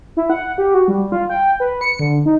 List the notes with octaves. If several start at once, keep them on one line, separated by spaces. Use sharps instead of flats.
E4
F#5
G4
F#4
G3
F4
G5
B4
C#7
D3
D#4